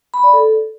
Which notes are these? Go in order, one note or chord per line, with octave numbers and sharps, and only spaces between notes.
B5
D5
A4